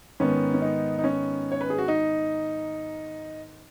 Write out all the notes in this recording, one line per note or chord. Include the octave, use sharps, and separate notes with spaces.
G#2 D#3 B3 C#4
C#4
D#4
D#4
C#4
C#5
B4
G#4
F#4
D#4